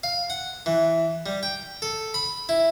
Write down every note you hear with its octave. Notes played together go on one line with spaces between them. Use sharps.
F5
F#5
E3
G3
G5
A4
B5
E4